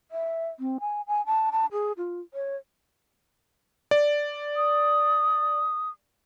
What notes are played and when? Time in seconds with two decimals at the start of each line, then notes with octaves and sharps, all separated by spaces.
0.11 E5
0.60 C4
0.80 G#5
1.07 G#5
1.26 A5
1.52 A5
1.72 G#4
1.97 F4
2.34 C#5
3.91 D5
4.56 D#6